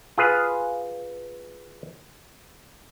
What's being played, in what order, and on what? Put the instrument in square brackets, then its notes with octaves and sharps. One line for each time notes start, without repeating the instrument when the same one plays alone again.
[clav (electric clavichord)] F4 G#4 B4 F5